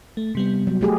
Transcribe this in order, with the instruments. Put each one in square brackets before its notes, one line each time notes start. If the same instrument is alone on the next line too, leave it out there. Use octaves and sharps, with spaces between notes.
[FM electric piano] A3
C3 G3 B3
[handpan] F#3
A3 G4 G#4